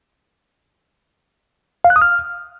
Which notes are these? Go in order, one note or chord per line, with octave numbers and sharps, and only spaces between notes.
F5
F#6
D#6
F6